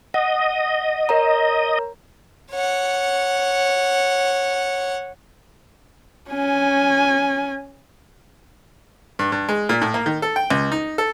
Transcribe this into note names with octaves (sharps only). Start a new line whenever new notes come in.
D#5 F#5
A#4 C#5 A#5
C#5 F#5
C#4 G#5
G2
G2
G#3
A#2
A2
A#3
D#3
A4
G5
C#2
D#4
A4